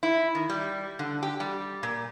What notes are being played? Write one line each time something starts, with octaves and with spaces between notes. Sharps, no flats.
E4
D#3
G3
D3
G4
G3
A#2